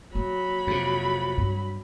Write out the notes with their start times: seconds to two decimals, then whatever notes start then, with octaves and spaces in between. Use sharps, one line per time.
0.15 F#3 A#3 D#4 B5
0.67 F2 C3
1.37 G2 C4